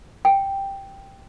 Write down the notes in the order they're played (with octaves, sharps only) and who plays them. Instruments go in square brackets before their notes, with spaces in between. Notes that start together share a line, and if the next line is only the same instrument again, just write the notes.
[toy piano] G5